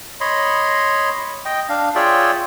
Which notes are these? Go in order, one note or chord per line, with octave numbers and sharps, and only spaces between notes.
C#5 D#5 B5 C6
D#5 G5
D4 F5
F4 G#4 C#5 D5 E5 G5